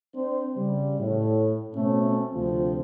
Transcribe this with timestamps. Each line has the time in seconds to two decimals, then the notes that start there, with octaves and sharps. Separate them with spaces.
0.15 C4 D4 C5
0.56 C#3 G3
0.99 A2
1.75 B2 A3 C4 C#4
2.33 D2 C3 F3 C4 F4